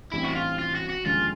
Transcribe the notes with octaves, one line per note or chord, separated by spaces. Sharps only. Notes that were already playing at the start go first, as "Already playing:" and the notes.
A1 G2 E3 G3 C4 E4
F#4
F4
F4
F#4
F#4
D#2 D3 F3 G#3 C#4 F4